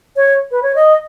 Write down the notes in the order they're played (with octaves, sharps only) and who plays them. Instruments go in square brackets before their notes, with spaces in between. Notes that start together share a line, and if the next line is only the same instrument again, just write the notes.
[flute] C#5
B4
C#5
D#5